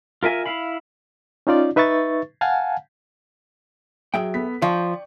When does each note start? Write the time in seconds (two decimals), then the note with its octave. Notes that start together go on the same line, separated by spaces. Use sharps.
0.23 F4 A#4 E5 G#5
0.46 E4 F5 B5
1.47 C#4 D#4 F4 D5
1.76 D#4 B4 E5 C#6 A6
2.41 F5 F#5 G#5 A5
4.14 F#3 G#4 E5 G5
4.34 B3 A4 B6
4.62 F3 D5 F5 G5 C#6